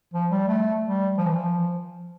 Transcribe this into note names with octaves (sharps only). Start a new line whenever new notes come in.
F3
G3
A3
G3
F3
E3
F3